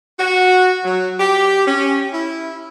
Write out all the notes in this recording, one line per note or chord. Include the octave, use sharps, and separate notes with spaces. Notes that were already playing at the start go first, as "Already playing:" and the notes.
F#4
F#3
G4
C#4
E4